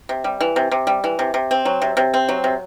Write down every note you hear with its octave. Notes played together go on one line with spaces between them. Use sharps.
C3
G3
E3
C3
C3
G3
E3
C3
C3
C4
F#3
C3
C3
C4
F#3
C3